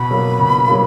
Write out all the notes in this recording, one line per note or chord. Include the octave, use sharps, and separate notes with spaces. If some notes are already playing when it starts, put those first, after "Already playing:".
Already playing: B2 B5
F#3 A#3
B2
F#3 A#3